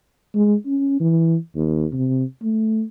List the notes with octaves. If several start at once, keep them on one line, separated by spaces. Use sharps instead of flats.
G#3
C#4
E3
D#2
C3
A3